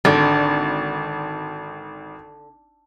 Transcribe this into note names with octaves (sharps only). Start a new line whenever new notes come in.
G#1 D3